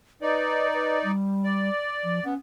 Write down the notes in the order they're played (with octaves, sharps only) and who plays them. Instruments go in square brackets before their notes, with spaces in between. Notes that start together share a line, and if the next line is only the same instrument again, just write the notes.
[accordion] D#4 D5 [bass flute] B4
[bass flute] B4
G3
[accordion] D5
[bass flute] F3
[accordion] B3 [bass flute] C#4